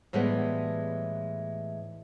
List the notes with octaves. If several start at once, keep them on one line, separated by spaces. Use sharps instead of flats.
A2 E3 G3 G#3 B3